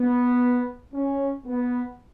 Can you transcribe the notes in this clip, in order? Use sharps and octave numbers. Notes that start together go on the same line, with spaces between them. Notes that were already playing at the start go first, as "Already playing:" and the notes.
Already playing: B3
C#4
B3